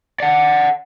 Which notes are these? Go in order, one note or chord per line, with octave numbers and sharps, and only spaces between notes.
D5 F#5